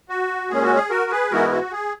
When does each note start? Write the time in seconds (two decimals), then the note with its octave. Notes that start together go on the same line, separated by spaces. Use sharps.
0.09 F#4
0.50 A#2 G#3 C#4 G#4
0.63 F#4
0.75 G#4
0.90 F#4 A#4
1.11 G#4 B4
1.31 G#2 E3 G#3 B3 E4 F#4 A#4
1.51 F#4
1.72 G#4